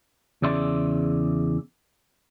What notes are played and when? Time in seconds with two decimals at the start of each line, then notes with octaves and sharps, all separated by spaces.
0.42 E2 C#3 D5 E5 C6